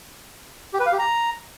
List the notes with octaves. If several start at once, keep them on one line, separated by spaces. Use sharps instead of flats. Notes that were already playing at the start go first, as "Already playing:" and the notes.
G4
B4
F5
G4
A#5